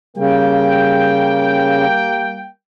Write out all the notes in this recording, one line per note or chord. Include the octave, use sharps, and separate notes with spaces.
C#3 G3 A#3 G5